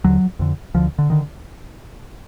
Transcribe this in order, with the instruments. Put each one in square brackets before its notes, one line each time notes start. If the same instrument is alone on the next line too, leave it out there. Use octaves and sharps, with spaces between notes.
[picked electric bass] D#2 D3 F#3
F2 D3
D2 D3 F3
D3
D3 D#3